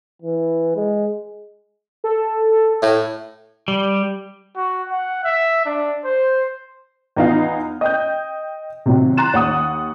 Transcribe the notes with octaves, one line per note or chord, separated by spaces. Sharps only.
E3
G#3
A4
A2
G3
F#4
F#5
E5
D4
C5
E2 B3 D#4 F4 F5
D#5 G5 G6
C3 D#3 F#3
A#5 C6 F#6 A6 E7
D#2 F#5 D#6